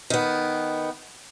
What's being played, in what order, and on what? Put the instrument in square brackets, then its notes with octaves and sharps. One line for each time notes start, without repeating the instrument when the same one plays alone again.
[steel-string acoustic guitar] D#3 B3